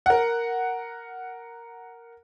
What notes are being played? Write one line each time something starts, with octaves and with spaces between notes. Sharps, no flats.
A#4 F#5